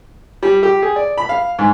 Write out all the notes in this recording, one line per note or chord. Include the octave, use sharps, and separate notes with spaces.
G3
G4
G#4
D5
B5
F5
G#2